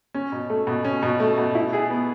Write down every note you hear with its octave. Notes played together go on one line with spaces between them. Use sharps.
C#4
B2
A3
B2
C#4
B2
A3
B2
E4
G#4
B3